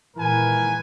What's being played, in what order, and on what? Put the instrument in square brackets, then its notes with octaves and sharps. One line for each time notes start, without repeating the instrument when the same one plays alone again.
[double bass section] A#2 D#3 G#3 [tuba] E3 [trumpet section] A#4 B4 G#5